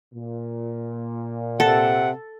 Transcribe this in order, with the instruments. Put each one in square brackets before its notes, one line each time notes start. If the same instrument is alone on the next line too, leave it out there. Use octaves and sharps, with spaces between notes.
[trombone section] A#2
[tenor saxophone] C3 [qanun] A4 [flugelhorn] F#5